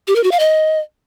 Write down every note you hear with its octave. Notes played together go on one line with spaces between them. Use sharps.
G4
A#4
F#4
F5
D#5